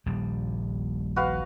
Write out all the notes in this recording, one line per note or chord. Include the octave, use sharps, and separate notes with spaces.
D#1 A#1 G3
F#4 B4 F5